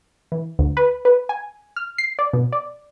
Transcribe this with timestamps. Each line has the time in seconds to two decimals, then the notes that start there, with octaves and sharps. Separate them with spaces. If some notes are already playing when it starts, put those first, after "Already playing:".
0.32 E3
0.59 D2
0.77 B4
1.05 B4
1.29 G#5
1.76 F6
1.98 C7
2.19 D5
2.33 B2
2.53 D5